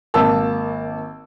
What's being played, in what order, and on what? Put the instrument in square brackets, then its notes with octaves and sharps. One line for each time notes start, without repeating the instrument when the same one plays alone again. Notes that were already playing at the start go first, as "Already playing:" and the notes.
[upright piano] G#1 A#3 A5 E6